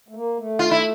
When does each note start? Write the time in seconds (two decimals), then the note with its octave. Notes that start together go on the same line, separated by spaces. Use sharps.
0.08 A3
0.14 A#3
0.38 A3
0.59 F4
0.71 E4